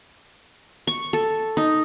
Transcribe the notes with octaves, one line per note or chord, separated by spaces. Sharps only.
C#6
A4
D#4